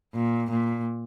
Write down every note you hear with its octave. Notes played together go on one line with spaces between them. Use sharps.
A#2
A#2